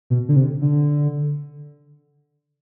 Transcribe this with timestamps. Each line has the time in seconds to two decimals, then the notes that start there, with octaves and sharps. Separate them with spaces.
0.10 B2
0.29 D3
0.36 C3
0.62 D3